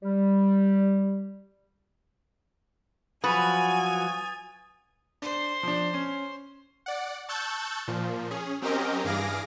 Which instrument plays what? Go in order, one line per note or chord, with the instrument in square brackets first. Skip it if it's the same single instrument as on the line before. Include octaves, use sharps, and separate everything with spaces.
[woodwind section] G3
[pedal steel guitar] F3 F#3 F#4 [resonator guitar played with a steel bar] B4 [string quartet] G#5 [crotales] D#6 A6
[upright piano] D4 [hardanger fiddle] C5
[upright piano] F3 D4
C#4
[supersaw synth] D5 F#5
A5 C#6 E6 F#6 G6 A6
A#2 F3
C#4 G#4
F#3 C4 C#4 G4 A#4 D#5
G2 E3 G#4 F5 D6 A#6